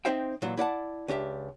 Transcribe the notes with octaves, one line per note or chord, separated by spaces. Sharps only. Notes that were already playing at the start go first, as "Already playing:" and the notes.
C4 D#4 C5 E5 G5
A#2 E3 F#3
E4 D5 F#5 A5
C#2 D4 G4 E5